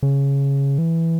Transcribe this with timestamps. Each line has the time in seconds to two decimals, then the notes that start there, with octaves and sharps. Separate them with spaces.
0.03 C#3
0.78 E3